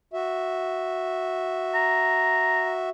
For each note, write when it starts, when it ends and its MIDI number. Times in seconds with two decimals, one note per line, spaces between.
0.13 2.89 66
0.13 2.89 76
1.74 2.73 82